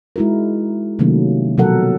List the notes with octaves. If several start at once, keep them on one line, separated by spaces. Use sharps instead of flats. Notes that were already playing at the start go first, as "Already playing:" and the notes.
G#3 D#4 E4 F#4 A#4
C3 D#3 F#3 A3 A#3 C#4
B2 F3 F#3 A4 A#4 F#5